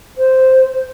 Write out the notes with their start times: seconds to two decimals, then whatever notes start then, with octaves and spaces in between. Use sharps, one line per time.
0.17 C5